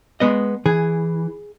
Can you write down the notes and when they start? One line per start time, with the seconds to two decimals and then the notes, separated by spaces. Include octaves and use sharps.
0.20 G#3 B3 D#5
0.66 E3 G#4